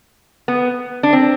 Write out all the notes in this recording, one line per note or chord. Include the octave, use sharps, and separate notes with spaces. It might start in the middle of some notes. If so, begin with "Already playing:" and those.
B3
D4
C4